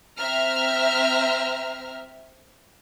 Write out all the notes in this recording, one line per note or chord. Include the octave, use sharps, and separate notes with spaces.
C4 E5 A#5 F6